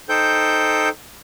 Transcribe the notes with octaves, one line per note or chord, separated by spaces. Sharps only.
D#4 A4 C5 G5 G6